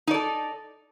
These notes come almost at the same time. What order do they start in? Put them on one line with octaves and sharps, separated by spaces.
D#4 D5 A4